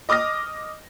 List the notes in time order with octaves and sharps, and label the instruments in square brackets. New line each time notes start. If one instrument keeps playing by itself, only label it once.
[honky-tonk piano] D#5 D6 D#6 F6 A#6